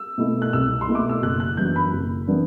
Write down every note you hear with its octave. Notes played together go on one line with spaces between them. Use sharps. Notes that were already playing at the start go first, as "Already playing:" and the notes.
Already playing: E6
B2 A3 E4
F#6
C2 E6
C6
B2 A3 E4
D6
E6
F#1 F#6
F#6
F#2 E3 B3 D4 G6
B5
F#1
E3 B3 D4